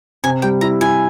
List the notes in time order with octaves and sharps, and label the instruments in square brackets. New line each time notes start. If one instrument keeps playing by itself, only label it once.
[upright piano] C3 [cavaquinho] G#5
[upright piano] G3 [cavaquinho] G5
[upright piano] E4 [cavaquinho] A#5
[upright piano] E4 [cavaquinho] G#5